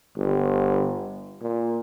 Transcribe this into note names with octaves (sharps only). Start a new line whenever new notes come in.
G1
A#2